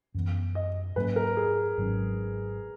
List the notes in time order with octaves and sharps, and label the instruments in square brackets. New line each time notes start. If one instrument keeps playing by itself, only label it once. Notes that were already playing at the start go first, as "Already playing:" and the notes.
[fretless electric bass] F#2 E3 B3
[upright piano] D#5
[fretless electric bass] G#2 F#3 A#3 C#4 [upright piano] B4
[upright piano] A#4
G#4
[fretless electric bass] G#1 G#2 F#3 C#4